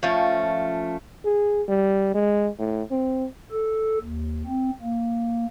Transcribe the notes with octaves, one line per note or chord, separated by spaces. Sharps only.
F3 A3 C#4
G#4
G3
G#3
A2
C4
A4
D#2
C4
A#3